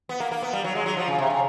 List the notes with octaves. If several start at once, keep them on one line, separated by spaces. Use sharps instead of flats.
B3
A#3
A#3
B3
G3
F#3
G#3
F#3
F3
C#3
C3
C#3